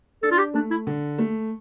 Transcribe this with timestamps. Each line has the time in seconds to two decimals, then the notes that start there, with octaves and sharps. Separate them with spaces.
0.23 D4 A4
0.31 F4
0.38 G4
0.54 A3 D4
0.71 E4
0.87 D3
1.19 A3